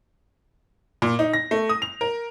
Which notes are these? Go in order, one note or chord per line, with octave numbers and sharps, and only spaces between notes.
A#2
D#4
A#6
A3
D#6
F7
A#4